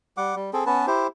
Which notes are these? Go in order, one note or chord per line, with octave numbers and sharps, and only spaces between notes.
G3 F#5 D6
G3
C4 G#4 A4
B3 C#4 B4 A5
E4 G4 C5